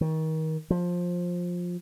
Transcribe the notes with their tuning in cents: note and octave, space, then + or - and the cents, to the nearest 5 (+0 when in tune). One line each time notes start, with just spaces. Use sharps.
D#3 +30
F3 +15